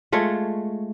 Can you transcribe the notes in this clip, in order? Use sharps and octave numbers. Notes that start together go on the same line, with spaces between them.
G#3 A3 F4 C#5